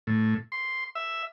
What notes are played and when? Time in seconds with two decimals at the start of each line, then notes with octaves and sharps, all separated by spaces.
0.07 A2
0.52 C6
0.95 E5